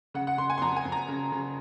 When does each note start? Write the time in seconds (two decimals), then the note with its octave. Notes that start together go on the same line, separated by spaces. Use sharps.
0.14 C#3 F#5
0.27 F#5
0.38 C#3 C6
0.50 G#5
0.58 C6
0.62 F2 A#5
0.77 G#5
0.85 F2
0.92 A#5
1.08 C#3
1.32 C#3